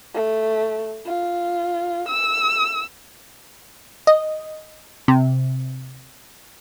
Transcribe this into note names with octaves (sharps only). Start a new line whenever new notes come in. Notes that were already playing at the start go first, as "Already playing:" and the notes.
A3
F4
E6
D#5
C3